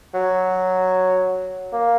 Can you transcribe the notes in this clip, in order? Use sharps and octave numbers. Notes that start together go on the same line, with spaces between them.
F#3
A#3